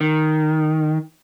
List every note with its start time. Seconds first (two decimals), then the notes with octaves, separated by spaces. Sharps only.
0.01 D#3